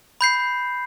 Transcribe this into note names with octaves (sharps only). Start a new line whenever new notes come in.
B5 G6 C7